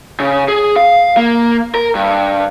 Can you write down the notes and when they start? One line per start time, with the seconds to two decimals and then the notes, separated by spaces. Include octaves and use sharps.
0.20 C#3
0.48 G#4
0.76 F5
1.17 A#3
1.75 A#4
1.95 G2